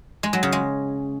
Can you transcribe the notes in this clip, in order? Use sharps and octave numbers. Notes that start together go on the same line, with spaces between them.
G#3
F#3
C#3
G#3